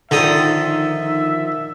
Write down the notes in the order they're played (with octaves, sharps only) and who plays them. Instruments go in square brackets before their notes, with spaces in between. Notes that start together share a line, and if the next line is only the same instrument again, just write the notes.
[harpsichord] D3 A4 D#6 [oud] D#3 F3 [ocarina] D#4 [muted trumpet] E5